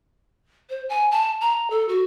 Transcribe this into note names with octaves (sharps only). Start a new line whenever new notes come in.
C5
G#5
A5
A#5
A4
F#4